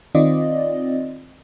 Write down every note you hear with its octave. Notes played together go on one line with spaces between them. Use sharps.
D#3 C4 F4 D5 D#5